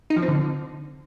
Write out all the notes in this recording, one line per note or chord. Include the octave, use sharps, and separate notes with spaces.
D#4
F3
C4
D3